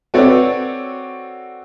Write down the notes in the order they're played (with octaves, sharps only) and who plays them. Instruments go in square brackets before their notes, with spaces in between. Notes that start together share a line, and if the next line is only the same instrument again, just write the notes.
[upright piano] C4 F#4 A4 B4 C#5 D5